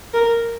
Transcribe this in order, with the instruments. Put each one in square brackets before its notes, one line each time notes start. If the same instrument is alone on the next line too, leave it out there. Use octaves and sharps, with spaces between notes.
[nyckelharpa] A#4